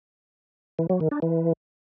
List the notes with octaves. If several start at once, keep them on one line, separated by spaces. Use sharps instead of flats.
E3
F#3
D#3
D4
E3